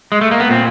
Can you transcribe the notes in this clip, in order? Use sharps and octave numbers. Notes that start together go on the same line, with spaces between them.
G#3
A3
A#3
B3
A#2 C4